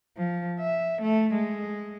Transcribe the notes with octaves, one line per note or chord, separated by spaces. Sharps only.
F3
E5
A3
G#3